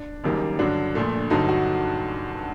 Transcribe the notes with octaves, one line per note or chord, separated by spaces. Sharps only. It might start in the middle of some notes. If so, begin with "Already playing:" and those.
Already playing: D4
F#1 F#2 D#3 G3 A#3
G2 D3 F#3 D4
A#1 A#2 A3
G1 G2 D3 F#3 D#4
F#4